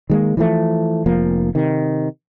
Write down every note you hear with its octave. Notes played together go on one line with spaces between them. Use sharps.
D#3 G#3 A#3
E3 F3 A3
F1 F3 A#3
C3 D#3